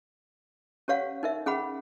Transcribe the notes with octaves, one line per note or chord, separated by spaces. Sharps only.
C#4 G4 C#5 F5 F#5
D#4 A#4 E5
C#4 G#4 F#5 B5